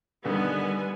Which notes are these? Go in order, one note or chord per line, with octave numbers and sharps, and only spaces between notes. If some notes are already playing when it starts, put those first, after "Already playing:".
G2 D3 D#3 G3 B3 G#5